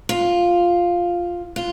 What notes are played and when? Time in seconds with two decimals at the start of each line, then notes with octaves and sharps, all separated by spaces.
0.09 F4
1.56 F4